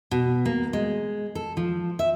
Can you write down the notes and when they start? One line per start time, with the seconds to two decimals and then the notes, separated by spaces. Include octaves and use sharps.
0.11 B2
0.45 A#3
0.73 G#3
1.35 A4
1.57 F3
1.99 E5